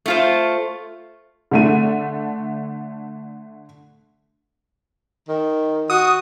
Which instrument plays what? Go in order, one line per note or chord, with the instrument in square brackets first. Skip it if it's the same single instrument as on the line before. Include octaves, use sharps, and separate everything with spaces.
[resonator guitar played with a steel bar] A3 F4 C5
[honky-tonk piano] D3 A3 D#7
[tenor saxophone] D#3
[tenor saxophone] F#4 [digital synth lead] D#6